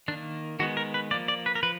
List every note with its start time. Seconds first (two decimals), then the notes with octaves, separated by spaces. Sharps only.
0.08 D#3 D4
0.11 A#3
0.59 D#3 G#3 B3 F#4
0.77 A#4
0.94 B4
1.11 F3 A#3 D5
1.28 D5
1.46 B4
1.55 A#4
1.63 F3 B4